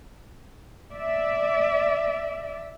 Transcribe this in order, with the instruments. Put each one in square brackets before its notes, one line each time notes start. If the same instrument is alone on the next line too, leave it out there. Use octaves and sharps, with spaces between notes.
[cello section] D5 E5